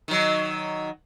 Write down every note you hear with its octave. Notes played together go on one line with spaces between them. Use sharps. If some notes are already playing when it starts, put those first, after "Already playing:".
D#3 F#3